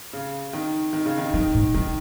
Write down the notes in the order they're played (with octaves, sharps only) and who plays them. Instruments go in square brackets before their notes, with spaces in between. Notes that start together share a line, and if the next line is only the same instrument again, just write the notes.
[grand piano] C#3
D#3
D#3
C#3
D#3
[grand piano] D#3 [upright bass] F#3
[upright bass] G#2
[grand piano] D#3 [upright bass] F#3